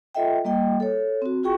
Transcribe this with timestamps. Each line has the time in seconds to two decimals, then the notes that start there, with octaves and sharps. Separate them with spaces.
0.15 F4 A4 D#5 E5 G5
0.45 G3 A#3 D#5 G5
0.80 A4 C#5
1.22 C4 F#4
1.43 F4 F#4 G#4 G5 C#6